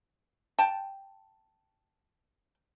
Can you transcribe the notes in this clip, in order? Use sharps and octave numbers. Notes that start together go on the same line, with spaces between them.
G5 A5